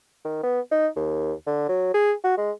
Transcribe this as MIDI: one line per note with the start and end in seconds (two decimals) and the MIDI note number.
0.25 0.43 51
0.43 0.60 59
0.71 0.88 63
0.96 1.33 39
1.47 1.66 50
1.69 1.93 54
1.94 2.13 68
2.24 2.36 66
2.38 2.52 56